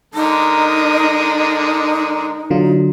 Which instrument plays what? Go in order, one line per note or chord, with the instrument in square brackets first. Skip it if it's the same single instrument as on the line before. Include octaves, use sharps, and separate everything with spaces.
[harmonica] D3 G#3 A#4 [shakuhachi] D#4
[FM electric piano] D3 F#3 F4